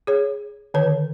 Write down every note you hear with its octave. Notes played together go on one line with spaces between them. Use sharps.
G#4 C#5
D3 D#3 B4 C#5